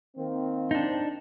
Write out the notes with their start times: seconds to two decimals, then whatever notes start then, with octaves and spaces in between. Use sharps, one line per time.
0.17 D#3 A#3 C4
0.71 D4 D#4